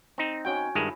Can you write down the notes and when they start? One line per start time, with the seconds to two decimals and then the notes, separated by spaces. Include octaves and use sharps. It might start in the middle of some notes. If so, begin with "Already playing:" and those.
0.18 C4 D#4
0.45 C#4 F#4 G5
0.75 G2 D#3 G#3 E4